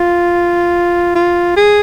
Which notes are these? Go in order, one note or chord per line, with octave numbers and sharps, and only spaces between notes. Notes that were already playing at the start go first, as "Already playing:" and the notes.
Already playing: F4
F4
G#4